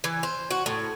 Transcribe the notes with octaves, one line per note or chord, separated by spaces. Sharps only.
E3
C5
F#4
A2